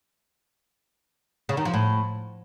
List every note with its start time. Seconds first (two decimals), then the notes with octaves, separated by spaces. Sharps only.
1.49 C#3
1.57 D#3
1.65 F3
1.74 A2